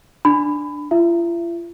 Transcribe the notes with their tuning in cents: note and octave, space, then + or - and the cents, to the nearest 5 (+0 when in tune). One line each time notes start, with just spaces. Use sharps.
D4 +5 B5 +20
F4 -45 E5 +25